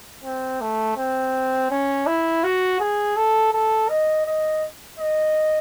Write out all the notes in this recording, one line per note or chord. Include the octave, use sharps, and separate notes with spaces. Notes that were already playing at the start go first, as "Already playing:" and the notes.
C4
A3
C4
C#4
E4
F#4
G#4
A4
A4
D#5
D#5
D#5